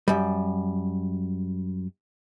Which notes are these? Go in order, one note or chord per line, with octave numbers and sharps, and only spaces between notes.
F#2 G3